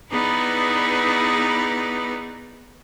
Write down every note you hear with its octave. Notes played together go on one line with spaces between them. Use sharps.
B3 D#4 E4 G#4 B4 D5